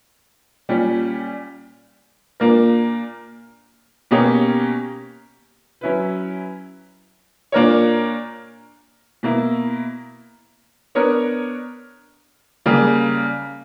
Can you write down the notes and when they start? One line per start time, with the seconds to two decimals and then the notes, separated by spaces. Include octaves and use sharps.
0.69 A#2 G3 C#4
2.40 A#2 A#3 D4 A#4
4.11 B2 A#3 C#4 G4 C#5
5.81 F#3 C#4 E4 B4
7.52 A#2 A#3 D4 A#4 C#5
9.23 B2 A#3 E4
10.95 B3 D4 A#4 C#5
12.66 C#3 G3 A#3